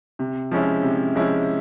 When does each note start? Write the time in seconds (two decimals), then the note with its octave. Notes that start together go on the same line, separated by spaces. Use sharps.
0.19 C3
0.51 F3 G#3 C#4 E4
0.83 C3
1.15 F3 G#3 C#4 E4